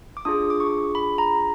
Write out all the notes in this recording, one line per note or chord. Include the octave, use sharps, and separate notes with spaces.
D6
D4 F4 G#4 D#6
D6
C#6
B5
A#5